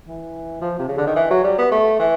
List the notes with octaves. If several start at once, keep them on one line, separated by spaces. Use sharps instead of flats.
E3
F3
C3
C#3
D3
D#3
E3
F#3
G3
B3
A3
E3